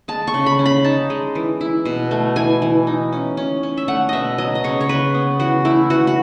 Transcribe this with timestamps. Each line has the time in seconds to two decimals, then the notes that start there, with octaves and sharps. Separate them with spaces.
0.08 G#3 A5
0.27 C#6
0.34 C#3
0.46 B5
0.59 C#4
0.66 B5
0.84 D#4 A5
1.10 G#3
1.35 E3
1.61 E4
1.85 B2
2.11 A3
2.36 E3 G#5
2.62 E3
2.87 D#4
3.13 C#4
3.37 C#4
3.63 C#4
3.77 E5
3.88 A3 F#5
4.09 B2 D#5 E5
4.38 F#3 D#5
4.55 D#5
4.64 C#3 C#5
4.81 C#5
4.89 C#3 B4
5.14 B3
5.39 E3 F#4
5.65 A3 E4
5.90 E3 F#4
6.07 F#4